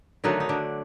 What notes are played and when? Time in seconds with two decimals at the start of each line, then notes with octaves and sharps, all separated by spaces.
0.24 D3 D#3 F#3 A3 D#4
0.40 D#4
0.49 D3 D4